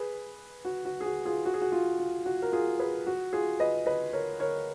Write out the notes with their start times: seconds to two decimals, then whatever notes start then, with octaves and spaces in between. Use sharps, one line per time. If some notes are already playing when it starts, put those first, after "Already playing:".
Already playing: G#4 B4
0.65 F#4
0.85 F#4
1.01 G#4
1.05 F#4
1.25 F4 G#4
1.45 F#4
1.54 G#4
1.61 F#4
1.72 F4
1.99 F4
2.26 F#4
2.42 A#4
2.52 F4 G#4
2.79 G#4 B4
3.07 F#4
3.33 F4 G#4
3.60 B4 D#5
3.86 B4 D#5
4.13 A#4 C#5
4.40 A#4 C#5